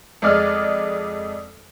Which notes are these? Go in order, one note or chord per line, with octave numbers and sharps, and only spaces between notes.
F2 G#3 D5 F6